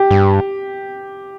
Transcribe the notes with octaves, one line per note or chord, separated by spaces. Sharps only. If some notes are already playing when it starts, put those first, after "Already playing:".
Already playing: G4
G2